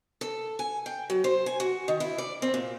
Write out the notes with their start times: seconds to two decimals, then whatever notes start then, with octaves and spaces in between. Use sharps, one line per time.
0.21 A4
0.59 G#5
0.86 G5
1.10 F#3
1.24 C5
1.46 G#5
1.60 F#4
1.88 D#3
2.00 E4
2.18 D5
2.42 C4
2.54 A#2